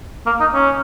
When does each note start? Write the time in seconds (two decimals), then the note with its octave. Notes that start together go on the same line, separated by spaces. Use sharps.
0.26 A#3
0.40 D#4
0.54 C#4